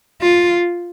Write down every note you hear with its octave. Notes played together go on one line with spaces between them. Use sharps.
F4